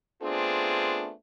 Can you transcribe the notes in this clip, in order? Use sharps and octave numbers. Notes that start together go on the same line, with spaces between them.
A3 B3 C4 D4 F4 G#4